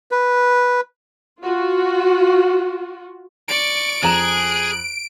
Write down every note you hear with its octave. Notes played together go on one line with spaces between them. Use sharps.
B4
F4 F#4
D5 C#6 D7
F2 G#4 A#5 F#6 E7